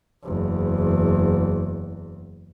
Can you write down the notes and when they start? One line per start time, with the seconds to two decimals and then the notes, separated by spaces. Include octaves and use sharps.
0.23 F#1 E2